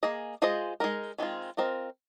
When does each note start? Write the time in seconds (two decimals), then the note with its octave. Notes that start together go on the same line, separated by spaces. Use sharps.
0.03 A#3 G#4 D#5
0.42 G#3 F4 G#4 C5 D#5
0.80 G#3 D#4 A#4
1.18 D#3 G#3 C4 F4
1.57 C4 F4 A#4 D#5